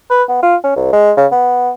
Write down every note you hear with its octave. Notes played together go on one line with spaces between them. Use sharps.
B4
B3
F4
C#4
C2
G#3
C#3
B3